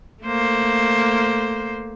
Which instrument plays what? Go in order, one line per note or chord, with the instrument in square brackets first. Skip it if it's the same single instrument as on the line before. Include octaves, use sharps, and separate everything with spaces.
[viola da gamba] A3 A#3 C5